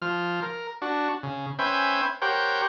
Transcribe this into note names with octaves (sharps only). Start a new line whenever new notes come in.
F3 F6
A#4
D4 F#4
C#3
C#4 B4 C5 E5 G5 G#5
G4 A#4 C5 C#5 F#5 G5